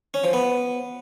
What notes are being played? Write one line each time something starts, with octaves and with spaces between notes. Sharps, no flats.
C#4
F3
B3